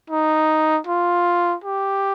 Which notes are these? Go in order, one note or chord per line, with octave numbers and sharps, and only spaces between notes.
D#4
F4
G4